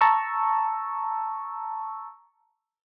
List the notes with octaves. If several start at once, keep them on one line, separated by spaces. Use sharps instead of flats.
A5 A#5 C#6 E6